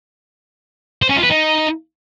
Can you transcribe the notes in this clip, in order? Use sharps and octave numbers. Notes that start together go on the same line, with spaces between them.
C5
C#4
F4
B4
D#4